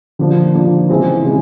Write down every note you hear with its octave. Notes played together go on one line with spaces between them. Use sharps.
D3 F3 A#3 D4 F4
D3 F3 A#3 D4 F4
C#3 E3 G#3 C4
C#3 E3 G#3 C4